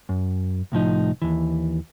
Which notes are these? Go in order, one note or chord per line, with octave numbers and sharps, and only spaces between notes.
F#2
C2 A2 F3 D#4
D#2 E3